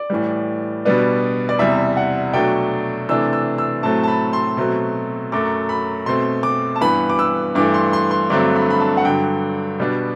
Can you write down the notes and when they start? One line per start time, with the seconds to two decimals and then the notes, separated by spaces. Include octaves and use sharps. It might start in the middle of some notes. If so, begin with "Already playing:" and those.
Already playing: D5
0.10 A2 E3 G3
0.85 B2 G3 B3 D4
1.49 D5
1.59 E2 C3 G3 E5
1.97 F#5
2.33 B2 F#3 A3 D4 G5
3.08 C3 E3 A3 D4 E6
3.33 E6
3.58 E6
3.83 A2 F#3 A3 C4 A5
4.03 A5
4.08 B5
4.33 C6
4.57 B2 F#3 A3 C4
5.32 F#2 F#3 A3 D6
5.69 B5
6.06 B2 A3 C4 C6
6.43 D6
6.76 A5
6.81 G2 E3 B3 B5
7.10 D6
7.19 E6
7.55 G2 E3 A3 D6
7.74 C6
7.93 C6
8.11 C6
8.30 G2 D3 F#3 A3 C4 D6
8.55 B5
8.70 B5
8.80 A5
8.97 F#5
9.05 G2 D3 F#3 G5
9.80 B2 G3 B3 D4